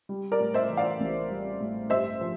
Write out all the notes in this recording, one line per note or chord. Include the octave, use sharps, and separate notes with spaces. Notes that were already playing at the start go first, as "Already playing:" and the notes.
G3
A#4 D5
A2
C5 E5
E3
D5 F5
A1
G3
A2
G2 C5 E5
F3